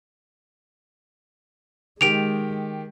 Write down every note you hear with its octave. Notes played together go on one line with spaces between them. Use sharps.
D#3 G#3 G4 D7 F7